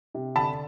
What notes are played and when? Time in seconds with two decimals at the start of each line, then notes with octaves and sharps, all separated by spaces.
0.15 C3
0.36 D3 A5 B5